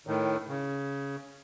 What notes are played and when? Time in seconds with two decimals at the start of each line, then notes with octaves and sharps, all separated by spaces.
0.07 A2 D#3
0.48 C#3